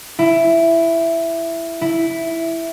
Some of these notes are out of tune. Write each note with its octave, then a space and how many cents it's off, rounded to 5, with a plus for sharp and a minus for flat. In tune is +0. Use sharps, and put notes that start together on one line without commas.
E4 +10
E4 +0